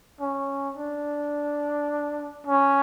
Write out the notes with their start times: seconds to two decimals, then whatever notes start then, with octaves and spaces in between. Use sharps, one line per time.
0.20 C#4
0.77 D4
2.47 C#4